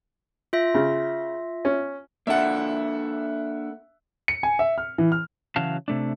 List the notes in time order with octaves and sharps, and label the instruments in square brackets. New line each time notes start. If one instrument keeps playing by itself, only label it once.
[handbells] F4 E5 A#6
[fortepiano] C#3
C#4
[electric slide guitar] A#3 D4 A4 [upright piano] E5 F#5
[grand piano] C#7
G#5
E5
F6
E3
F6
[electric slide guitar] C#3 E3 F#3 F#4 F5 A5
C3 A3 D4